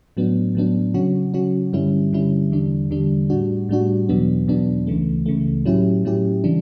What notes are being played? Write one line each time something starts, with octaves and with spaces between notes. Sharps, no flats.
A2 F#3 B3 D4
A2 F#3 B3 D4
C#3 F#3 C#4 F#4
C#3 F#3 C#4 F#4
G2 D3 G3 C#4 E4
G2 D3 G3 C#4 E4
E2 D3 G3 D4
E2 D3 G3 D4
A2 G3 D4 F#4
A2 G3 D4 F#4
E2 B2 F#3 B3 D4
E2 B2 F#3 B3 D4
C#2 C#3 E3 A3
C#2 C#3 E3 A3
A2 F#3 C#4 E4 G4
A2 F#3 C#4 E4 G4
C#3 E3 G3 D4